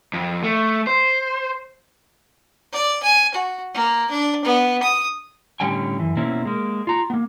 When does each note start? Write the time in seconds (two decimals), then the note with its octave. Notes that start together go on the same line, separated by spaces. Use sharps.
0.13 F2
0.44 A3
0.87 C5
2.73 D5
3.03 G#5
3.35 F#4
3.74 A#3
4.10 D4
4.45 B3
4.82 D#6
5.60 A2 D3 G3 C#4 G5 G#5
5.99 F#2 E3
6.17 B2 A#3 C4 C#4 E4
6.45 G#3 A#3
6.87 F4 A#5
7.10 A#3 B3